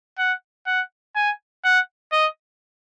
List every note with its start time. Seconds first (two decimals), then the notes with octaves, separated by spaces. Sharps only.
0.18 F#5
0.67 F#5
1.16 G#5
1.65 F#5
2.12 D#5